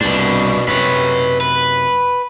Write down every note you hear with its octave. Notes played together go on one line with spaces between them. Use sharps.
C2 G2 B2 D4
F#2 C3 B4 C#5
B4